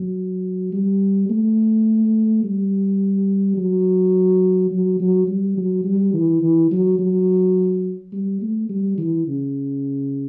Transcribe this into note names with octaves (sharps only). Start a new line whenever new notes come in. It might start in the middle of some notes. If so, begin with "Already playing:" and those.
Already playing: F#3
G3
A3
G3
F#3
F#3
F#3
G3
F#3
G3
E3
E3
F#3
F#3
G3
A3
G3
E3
C#3